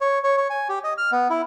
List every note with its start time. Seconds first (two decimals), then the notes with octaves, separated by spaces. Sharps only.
0.01 C#5
0.24 C#5
0.37 C#5
0.50 G#5
0.69 G4
0.84 D#5
0.98 F6
1.12 B3
1.30 E4